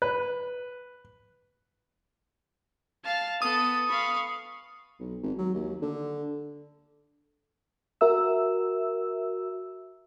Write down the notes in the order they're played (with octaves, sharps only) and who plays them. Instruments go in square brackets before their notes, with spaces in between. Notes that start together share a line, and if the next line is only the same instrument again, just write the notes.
[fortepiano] B4
[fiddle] F5 [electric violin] A5
[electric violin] B3 [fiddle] A4 [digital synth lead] D#6
[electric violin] F5 C#6 [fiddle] B5
[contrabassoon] B1
G#1
F#3
D#2
D3
[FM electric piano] F#4 A#4 E5 E6